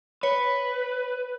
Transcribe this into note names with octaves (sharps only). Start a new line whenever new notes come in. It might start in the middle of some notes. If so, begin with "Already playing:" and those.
B4 C#5